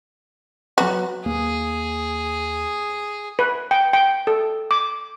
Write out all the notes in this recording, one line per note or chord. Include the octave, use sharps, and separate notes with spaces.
F#3 F#4 B4
D#2 A#3 G#4
B4
G5
G5
A4
D6